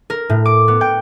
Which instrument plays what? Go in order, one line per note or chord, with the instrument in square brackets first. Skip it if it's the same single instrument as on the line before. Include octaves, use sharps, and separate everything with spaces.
[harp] A#4
A2
D6
B3
G5